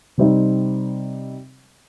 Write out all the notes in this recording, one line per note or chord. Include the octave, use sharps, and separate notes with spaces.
C3 G3 C4 D#4